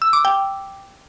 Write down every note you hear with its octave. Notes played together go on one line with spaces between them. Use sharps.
E6
D6
G5